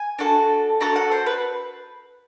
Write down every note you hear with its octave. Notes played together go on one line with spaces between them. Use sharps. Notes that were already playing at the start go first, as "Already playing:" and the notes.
Already playing: G#5
D4 F#4 A4
D4 F#4 A4 A#5
F#5
C5
B4